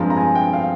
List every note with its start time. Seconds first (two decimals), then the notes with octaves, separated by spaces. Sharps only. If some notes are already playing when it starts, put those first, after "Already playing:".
Already playing: G2 F3 G#3 C4 A#5
0.10 A#5
0.17 G#5
0.35 G5
0.53 F5